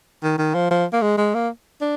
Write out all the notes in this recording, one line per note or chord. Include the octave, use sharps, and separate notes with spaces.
D#3
D#3
F3
F3
A#3
G#3
G#3
A#3
D4